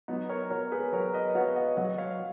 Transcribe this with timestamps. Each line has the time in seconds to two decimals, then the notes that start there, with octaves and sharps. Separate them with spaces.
0.08 F#3 B3 D#4
0.29 A#4 C#5
0.50 B3 F#4 A#4 C#5
0.72 G#4 B4
0.92 F#3 A#4 C#5
1.13 B4 D#5
1.35 B3 F#4 C#5 F5
1.56 D#5 F#5
1.77 F#3 D#5 F#5
1.98 C#5 F5